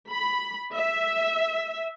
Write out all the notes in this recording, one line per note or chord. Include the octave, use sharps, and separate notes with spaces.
B5
E5